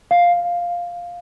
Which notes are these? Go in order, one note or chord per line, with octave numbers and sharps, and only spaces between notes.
F5